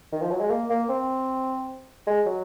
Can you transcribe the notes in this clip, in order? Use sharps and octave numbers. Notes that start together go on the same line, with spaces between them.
D#3
F3
F#3
G#3
A#3
A#3
C4
G#3
F#3